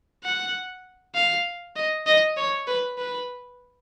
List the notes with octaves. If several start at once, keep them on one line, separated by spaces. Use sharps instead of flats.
F#5
F5
D#5
D#5
C#5
B4
B4